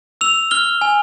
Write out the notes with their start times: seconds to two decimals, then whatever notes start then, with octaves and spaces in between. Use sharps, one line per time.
0.21 E6 F7
0.51 F6 G7
0.81 G#5